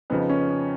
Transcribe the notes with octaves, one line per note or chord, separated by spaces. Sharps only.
F2 C#3 F3 B3 D#4
C#4